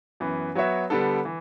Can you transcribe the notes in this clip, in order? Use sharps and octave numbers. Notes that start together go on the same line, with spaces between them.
F#2 E3 B3
F#3 B3 F#4 C#5 E5
D3 G3 B3 D4 A4
E3